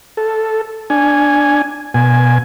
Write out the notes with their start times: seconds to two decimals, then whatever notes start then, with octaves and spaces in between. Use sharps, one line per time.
0.17 A4
0.90 D4 G#5
1.94 B2 G#5